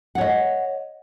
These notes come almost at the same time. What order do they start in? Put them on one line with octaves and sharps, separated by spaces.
F#5 C#5 D#5